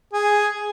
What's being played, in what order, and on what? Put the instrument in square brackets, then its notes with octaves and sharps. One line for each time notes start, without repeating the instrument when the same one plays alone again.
[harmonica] G#4